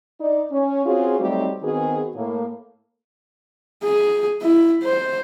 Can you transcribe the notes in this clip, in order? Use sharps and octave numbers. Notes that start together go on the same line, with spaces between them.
D#4 D5
C#4
C4 C#4 F4 F#4 G#4
F#3 G3 A3 C4 D#4 G4
D#3 B3 C4 F#4 G#4
A2 A#3
G#4
E4
C5